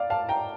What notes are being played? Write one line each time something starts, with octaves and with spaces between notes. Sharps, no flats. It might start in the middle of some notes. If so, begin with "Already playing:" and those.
Already playing: D5 F5
F5 A5
G5 A#5